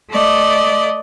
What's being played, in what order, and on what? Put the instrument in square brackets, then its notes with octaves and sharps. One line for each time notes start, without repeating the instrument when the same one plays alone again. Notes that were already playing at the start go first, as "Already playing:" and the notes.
[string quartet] A3 D5 D#5